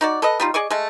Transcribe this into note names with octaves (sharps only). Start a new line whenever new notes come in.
D#4 F#4 D5
A4 B4 D#5
G3 D#4 F4
G#4 D5 D#5 C#6
G#3 A3